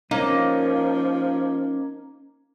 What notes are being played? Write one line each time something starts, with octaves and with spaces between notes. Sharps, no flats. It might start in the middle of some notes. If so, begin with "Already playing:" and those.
F3 A#3 C#4 D#4